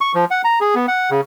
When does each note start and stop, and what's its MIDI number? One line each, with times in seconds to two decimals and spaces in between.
0.01 0.12 85
0.15 0.25 53
0.31 0.42 78
0.44 0.59 82
0.61 0.75 68
0.75 0.86 59
0.88 1.10 78
1.10 1.21 49